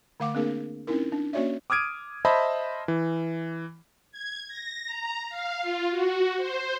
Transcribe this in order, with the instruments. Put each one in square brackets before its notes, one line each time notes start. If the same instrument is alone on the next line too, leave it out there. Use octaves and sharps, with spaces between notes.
[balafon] D3 A3 F5 F#5 D6
A#3 C4 D4 G#4 A#4
C4 C#4 D#4 E4 A#4
D4
A#3 C#4 F#4 C#5 D5 E5
[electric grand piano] D6 D#6 F6 G#6 D7 D#7
C5 D#5 E5 A5 B5
E3
[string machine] G#6
A#6
A#5
F5
F4
F#4
C5